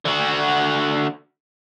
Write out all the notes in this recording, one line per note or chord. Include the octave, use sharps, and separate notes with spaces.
D3 F#4